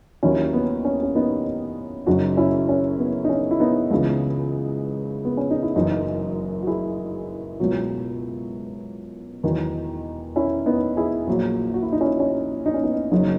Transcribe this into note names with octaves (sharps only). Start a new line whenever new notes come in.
D#2 D#3 F#3 C#4 E4
B3
C#4
C#4
B3 D#4
F#1 F#2 C#3 F#3 D#4 F#4
C#4 E4
C#4
B3
D#4
C#4
E4
B3 D#4
C#2 C#3 E3
B3
C#4
D#4
E4
F#1 F#2 E3 D#4 F#4
F#4
E4 G#4
C#2 B2 F#3
E2 D#3 F#3
C#4 E4
B3 D#4
E4 G#4
A#1 A#2 F#3
F#4
E4
D#4
C#4 E4
C#4
D#4
C#4
B3 D#4
F#1 F#2 C#3 F#3 D#4 F#4